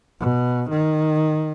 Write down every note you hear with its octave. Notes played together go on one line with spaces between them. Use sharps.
B2
D#3